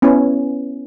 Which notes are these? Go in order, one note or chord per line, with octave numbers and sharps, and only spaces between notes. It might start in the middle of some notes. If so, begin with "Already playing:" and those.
B3 C#4 E4